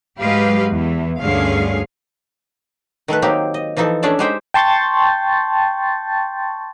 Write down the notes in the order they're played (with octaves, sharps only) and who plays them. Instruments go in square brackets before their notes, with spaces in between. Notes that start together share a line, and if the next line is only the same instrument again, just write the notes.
[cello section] G#2 F#3 G#3 G4 B4 F5
E2 E3
D2 G2 D3 C#4 G#4 F5
[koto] D#3 A3 A4 B4
F#3 A#3 C4 D#4 G4
D#5
E3 F3 D#4 E4 A4
A3 C#4 D4 G#4 D5 E5
G#3 D#4 G4 C5 E5 G5
[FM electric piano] G5 A5 C6 C#6 G6 A6